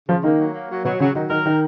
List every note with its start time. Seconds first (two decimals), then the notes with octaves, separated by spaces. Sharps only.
0.09 C#3 F3 F4
0.23 D#3 A#3 D#4
0.39 F#3
0.54 A#3
0.69 F#3
0.85 B2 F#3 B3
1.00 C#3 F#3 C#4
1.15 D#3 F#3 D#4
1.30 D#3 D#4 A#4
1.46 D#3 D#4